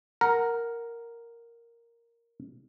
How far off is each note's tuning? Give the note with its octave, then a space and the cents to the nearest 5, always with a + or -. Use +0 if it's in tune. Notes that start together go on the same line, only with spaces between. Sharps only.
A#4 +0 F#5 +0 A#5 +0